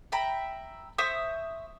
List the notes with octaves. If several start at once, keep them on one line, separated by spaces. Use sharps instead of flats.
E5 G5 A#5 B5
C5 E5 C#6 D#6